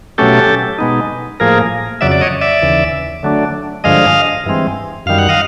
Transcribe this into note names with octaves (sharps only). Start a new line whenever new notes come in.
B2 F#3 A3 C#4 G4 A4
B2 G#3 B3 D#4
A2 F3 A#3 G#4 A#4
F2 C#3 F#3 D5 E5
D5
C#5 D#5
D5 E5
D#2 C#3 E3
D3 F#3 A3 D4
G2 D3 F3 G#3 D#5 F5
G2 E3 G#3 C4
F#2 D#3 G3 F5
F#5
D#5 F5